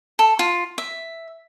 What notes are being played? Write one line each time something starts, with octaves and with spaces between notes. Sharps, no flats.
A4
F4
E5